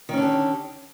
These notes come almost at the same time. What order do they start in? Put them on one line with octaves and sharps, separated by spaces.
D#3 C#4 D3 G4